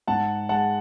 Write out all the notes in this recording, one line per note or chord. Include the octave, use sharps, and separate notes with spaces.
G#2 F#5 A5
G#3 F#5 A5